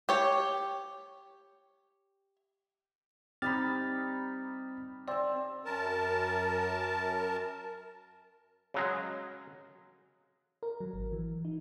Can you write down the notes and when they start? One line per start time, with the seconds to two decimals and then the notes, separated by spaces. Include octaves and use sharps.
0.09 G4 C#5
3.42 G3 C4 D#4 B5 F6 A6
5.08 C4 D5 E5
5.65 F#2 A#4 A5
8.74 C#3 F#3 G#3
10.63 A#4
10.80 F#3
10.94 G#1
11.12 E3
11.45 D#4